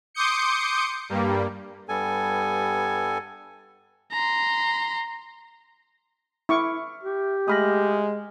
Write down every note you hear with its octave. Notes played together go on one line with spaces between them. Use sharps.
C6 D6 D#6 G6 C#7
G2 G3 A#3
G2 G3 B3 A4 G#5
A#5 C6
E4 E5 C#6 D6 F6
G4
G#3 A3 B5 D#6 F6 A#6